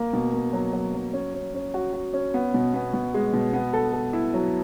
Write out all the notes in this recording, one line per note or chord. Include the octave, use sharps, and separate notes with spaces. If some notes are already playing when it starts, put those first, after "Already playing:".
Already playing: A#3
B2
A#3
F#3
F#3
F#3
C#4
C#4
C#4
F#4
F#4
C#4
B3
B2
B3
B2
G#3
B2
B3
A4
A4
E4
F#3